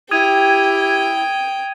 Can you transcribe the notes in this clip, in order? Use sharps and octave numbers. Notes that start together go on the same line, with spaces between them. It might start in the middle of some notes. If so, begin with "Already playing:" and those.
E4 G4 G5 D#6 G#6 D#7